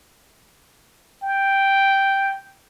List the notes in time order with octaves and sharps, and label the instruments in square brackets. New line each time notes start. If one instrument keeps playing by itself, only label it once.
[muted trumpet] G5